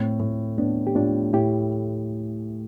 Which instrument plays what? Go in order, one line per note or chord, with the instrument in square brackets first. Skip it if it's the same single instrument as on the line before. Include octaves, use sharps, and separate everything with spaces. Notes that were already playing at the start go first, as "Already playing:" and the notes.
Already playing: [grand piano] A2 [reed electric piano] A3 C4
[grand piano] A2
[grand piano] A2 [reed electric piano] B3 D4
[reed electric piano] G4
[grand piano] A2 [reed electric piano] D4 F4
[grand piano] A2 [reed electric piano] E4 G4